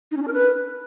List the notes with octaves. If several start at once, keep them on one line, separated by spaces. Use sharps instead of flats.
D#4
C#4
D4
A#4
B4